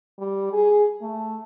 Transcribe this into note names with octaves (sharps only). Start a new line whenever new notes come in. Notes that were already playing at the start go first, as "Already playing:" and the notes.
G3
G#4
A3